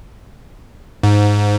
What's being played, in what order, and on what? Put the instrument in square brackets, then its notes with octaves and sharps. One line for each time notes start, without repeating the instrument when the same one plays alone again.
[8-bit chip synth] G#2